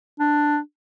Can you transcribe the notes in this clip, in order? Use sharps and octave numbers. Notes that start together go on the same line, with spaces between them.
D4